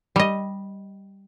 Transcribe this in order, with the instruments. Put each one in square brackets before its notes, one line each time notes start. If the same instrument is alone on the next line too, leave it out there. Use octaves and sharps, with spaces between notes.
[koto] G3 D#5